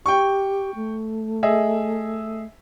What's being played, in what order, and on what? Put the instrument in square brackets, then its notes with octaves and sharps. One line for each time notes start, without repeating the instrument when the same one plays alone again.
[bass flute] G4 [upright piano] G5 C#6
[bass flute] A3
[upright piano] G#4 D#5 E5